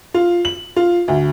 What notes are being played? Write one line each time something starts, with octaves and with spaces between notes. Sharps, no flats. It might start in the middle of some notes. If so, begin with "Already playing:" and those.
F4
F#7
F4
D2